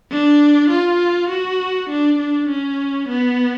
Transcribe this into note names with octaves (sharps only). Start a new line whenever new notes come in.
D4
F4
F#4
D4
D4
C#4
B3